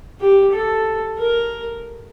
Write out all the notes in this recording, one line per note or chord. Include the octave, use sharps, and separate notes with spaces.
G4
A4
A#4